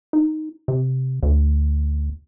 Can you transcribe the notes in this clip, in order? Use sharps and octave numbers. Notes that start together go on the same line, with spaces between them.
D#4
C3
D2